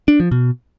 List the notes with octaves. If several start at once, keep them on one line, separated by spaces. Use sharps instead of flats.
D4
F3
B2